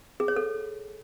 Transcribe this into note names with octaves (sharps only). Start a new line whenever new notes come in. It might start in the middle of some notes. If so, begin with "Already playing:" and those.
G#4
C#5
A4